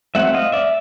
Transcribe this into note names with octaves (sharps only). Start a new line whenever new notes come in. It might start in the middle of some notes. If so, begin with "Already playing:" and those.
F#3 A3 C4 E5 F#5
D#5 F5
D5 E5